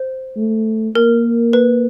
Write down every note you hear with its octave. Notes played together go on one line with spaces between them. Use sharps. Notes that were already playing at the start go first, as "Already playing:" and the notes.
Already playing: C5
A3
A#3 A#4
B4